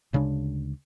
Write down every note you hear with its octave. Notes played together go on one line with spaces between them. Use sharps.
D2 C#3 G#3 D4